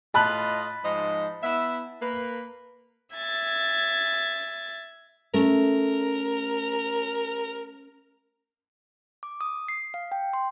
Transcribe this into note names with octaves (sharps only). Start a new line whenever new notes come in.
A2 F4 D#5 A5 B5 F#6
G#2 F3 D#5
B3 E4 E5
A#3 B4
E5 G#6 A6
A3 C#4 A#4
D6
D#6
C7
F5
G5
C6